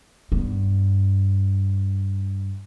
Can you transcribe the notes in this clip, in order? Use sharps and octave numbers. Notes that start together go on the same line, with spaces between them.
G2 B3